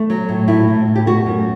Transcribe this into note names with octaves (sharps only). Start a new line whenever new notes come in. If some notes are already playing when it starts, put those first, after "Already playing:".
Already playing: A3
F#3
A2
A2 E4
A2
A2
G4
A3 F#4
F#2